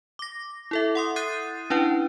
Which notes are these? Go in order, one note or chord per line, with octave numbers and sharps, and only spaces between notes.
D6 A#6
E4 A4 E5
F#5 C6 D#6
D#6 F#6 G6 A6 C7 D#7
C#4 D4 E4 B4 G5